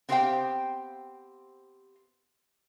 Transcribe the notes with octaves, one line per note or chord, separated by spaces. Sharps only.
B3 C4 G4 C5 F5 G5